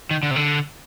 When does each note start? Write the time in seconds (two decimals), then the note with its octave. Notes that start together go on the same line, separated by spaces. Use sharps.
0.11 D#3
0.23 D3
0.31 C3
0.36 D3